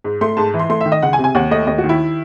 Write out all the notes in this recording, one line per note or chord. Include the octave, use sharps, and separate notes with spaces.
G#2
A3 C6
G#2 A5
E3
C6
A3 C6
D#3 E5
D#5
C#2 F#5
G#5
C3
G#5
D#2 F#5
A3 D#5
D#2 D#5
F#4
D#3
E4